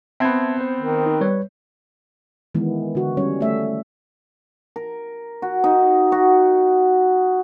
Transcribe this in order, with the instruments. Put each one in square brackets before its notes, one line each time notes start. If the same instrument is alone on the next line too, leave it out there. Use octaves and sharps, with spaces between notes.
[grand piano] B3 C4 [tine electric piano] E5 A5 G#6
[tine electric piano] C5
[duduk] D#3
[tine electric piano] D#4
G3 B4 C#5
[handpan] D#3 E3 G#3 B3
D3 F#4
G3 C#4 C#5
A3 E5
[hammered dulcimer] A#4
F#4
D#4
F#4